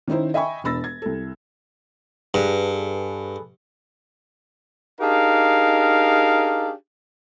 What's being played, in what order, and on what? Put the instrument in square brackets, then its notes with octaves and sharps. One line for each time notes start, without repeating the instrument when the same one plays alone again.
[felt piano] D#3 C#4 D#4 E4 C5
D#5 E5 G5 G#5 B5 C#6
E1 D4 B5 E6 A6 A#6
G#6
C2 A4
[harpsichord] G2 [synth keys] G#4 A4 B4
[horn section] D4 D#4 G4 G#4 A#4 F5